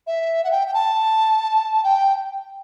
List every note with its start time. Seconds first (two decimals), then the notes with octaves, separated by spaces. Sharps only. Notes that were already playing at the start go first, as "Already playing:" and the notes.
0.07 E5
0.44 F#5
0.51 G5
0.67 G5
0.74 A5
1.84 G5